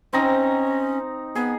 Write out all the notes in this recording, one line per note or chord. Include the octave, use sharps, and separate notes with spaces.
C4 C#4 D#4 A#5
B3 G#4